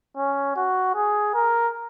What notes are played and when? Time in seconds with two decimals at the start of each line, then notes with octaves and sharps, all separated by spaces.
0.17 C#4
0.56 F#4
0.95 G#4
1.35 A#4